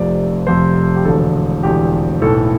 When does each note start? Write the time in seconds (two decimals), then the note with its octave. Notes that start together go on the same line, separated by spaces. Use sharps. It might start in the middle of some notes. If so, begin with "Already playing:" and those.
Already playing: F1 F2 C3 D5
0.47 F1 F2 C3 C5
0.96 G4
1.05 E1 E2 D3 A4
1.63 E1 E2 D3 G4
2.22 B1 A2 E3 A4